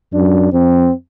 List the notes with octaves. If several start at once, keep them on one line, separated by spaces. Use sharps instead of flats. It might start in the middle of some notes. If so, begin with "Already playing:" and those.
F#2 D4
F2 C4